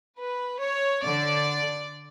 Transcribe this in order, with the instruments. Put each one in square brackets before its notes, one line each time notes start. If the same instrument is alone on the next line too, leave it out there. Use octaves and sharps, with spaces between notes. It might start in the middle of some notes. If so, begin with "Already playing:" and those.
[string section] B4
C#5
D3 D5